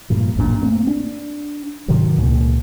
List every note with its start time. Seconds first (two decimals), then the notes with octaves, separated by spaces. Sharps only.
0.10 G2 A#2 F3
0.36 A1 F#2 A#2 D4
0.60 A3 A#3 C4
0.87 D4
1.88 G#2 C3 D#3 F#3
2.17 C#2 A#2